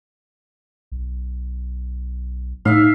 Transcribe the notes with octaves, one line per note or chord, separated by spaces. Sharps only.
B1
A2 D#4 E5 F5